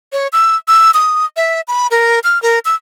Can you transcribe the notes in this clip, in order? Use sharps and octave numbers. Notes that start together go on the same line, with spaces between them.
C#5
E6
E6
D#6
E5
B5
A#4
F6
A#4
E6